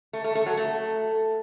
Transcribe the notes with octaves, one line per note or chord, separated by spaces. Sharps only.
A3
A3
A3
F#3
A3